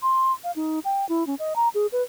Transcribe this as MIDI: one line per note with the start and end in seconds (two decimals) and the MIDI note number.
0.03 0.32 84
0.44 0.51 77
0.56 0.79 63
0.85 1.07 79
1.09 1.26 64
1.27 1.35 61
1.39 1.54 75
1.56 1.69 82
1.75 1.87 68
1.92 2.02 71